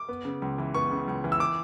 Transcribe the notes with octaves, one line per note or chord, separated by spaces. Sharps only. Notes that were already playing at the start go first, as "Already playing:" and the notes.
Already playing: D6
B3
C#3
C#2
E3
B3 C#6
C#3
C#2
E3
E6
D6